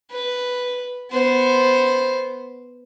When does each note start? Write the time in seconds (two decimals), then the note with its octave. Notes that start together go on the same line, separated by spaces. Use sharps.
0.11 B4
1.11 B3 C5